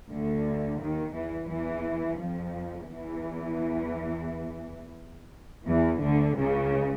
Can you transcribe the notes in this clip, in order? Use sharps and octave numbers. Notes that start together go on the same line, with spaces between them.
D2 D3
D#2 D#3
E2 E3
E2 E3
F2 F3
E2 E3
E2 E3
D2 D3
C#2 C#3